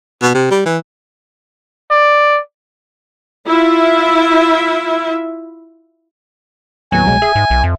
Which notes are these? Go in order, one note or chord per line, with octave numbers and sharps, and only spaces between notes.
B2
C3
G3
E3
D5
E4 F4 E5
D#2 A2 F#3 B3 G#5
C2 B2 G#3
G#4 E5
G#2
B1
F2